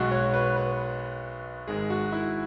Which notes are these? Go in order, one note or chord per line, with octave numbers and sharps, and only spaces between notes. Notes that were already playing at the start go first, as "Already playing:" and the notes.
Already playing: B1 B2 G#3 F#4
C#5
B4
B4
G#1 G#2 G#3 G#4
F#4
E4